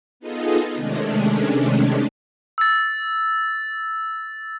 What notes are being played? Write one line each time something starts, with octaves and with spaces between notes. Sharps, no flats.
B3 D#4 F4 G#4 A4 D#5
C3 D#3 G#3 A3 C#4 D4
E6 A6